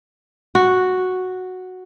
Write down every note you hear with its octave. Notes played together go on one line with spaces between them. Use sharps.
F#4